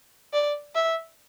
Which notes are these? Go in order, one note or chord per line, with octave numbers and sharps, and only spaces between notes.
D5
E5